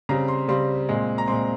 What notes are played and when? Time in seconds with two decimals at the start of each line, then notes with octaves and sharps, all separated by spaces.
0.09 C#3 G3 C4 A#5
0.28 C6
0.48 C#3 G3 C4 C6
0.89 A#2 G#3 C4
1.18 A#5
1.28 A#2 G#3 C4 C6